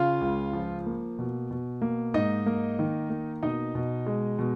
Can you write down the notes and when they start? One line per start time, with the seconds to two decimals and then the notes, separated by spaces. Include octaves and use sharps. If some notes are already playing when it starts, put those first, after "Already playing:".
Already playing: C#3 F4 F5
0.21 C#2
0.53 F3
0.86 A#3
1.19 B2
1.51 B2
1.82 A#3
2.14 G#2 D#4 D#5
2.46 A#3
2.79 D#3
3.10 A#3
3.43 B2 D#4 D#5
3.75 B2
4.07 G#3
4.39 B2